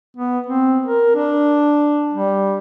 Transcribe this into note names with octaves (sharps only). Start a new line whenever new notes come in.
B3
C4
A#4
D4
G3